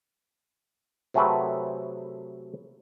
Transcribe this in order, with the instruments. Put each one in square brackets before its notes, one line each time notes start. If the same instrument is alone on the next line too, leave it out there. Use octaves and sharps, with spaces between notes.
[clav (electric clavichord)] C3 F#3 A3 G#4 A4 B4